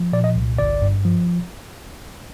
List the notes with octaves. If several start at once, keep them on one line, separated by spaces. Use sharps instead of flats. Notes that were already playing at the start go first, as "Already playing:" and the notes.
Already playing: F3
A#2 D5
D#5
C2
G1 D5
G2
F3